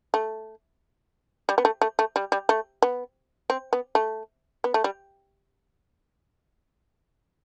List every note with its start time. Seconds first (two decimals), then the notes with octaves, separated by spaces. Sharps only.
0.14 A3
1.49 G3
1.58 B3
1.65 A3
1.81 A3
1.99 A3
2.16 G3
2.32 G3
2.49 A3
2.82 B3
3.50 C4
3.73 B3
3.95 A3
4.64 B3
4.74 A3
4.84 G3